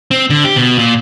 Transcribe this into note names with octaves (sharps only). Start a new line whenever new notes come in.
C4
D3
G4
B2
A#2